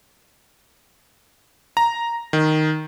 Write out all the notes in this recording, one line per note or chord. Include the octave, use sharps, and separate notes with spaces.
A#5
D#3